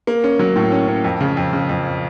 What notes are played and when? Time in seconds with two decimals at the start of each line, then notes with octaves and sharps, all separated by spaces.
0.07 A#3
0.24 C#4
0.39 F#3
0.56 A2
0.72 C#4
0.88 C#4
1.04 F2
1.21 C#3
1.37 F2
1.53 C#3
1.69 F2